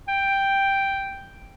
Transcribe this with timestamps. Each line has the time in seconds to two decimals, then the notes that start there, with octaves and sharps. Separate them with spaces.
0.08 G5